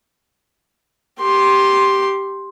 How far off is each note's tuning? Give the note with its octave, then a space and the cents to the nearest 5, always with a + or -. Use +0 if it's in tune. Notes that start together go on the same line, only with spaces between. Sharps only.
G4 +0 C6 +5